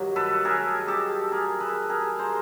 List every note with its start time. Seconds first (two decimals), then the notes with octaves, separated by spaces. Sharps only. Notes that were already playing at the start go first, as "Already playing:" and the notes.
Already playing: G2 D#3 F#3
0.16 A4 B4
0.45 G#4 A#4
0.88 G4 A4
1.32 G#4 A#4
1.60 A4 B4
1.89 G#4 A#4
2.18 A#4 C5